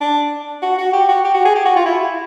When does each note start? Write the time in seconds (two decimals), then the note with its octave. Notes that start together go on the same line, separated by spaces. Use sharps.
0.01 D4
0.62 F#4
0.78 F#4
0.93 G4
1.09 F#4
1.25 G4
1.34 F#4
1.45 G#4
1.56 G4
1.65 F#4
1.76 F4
1.86 E4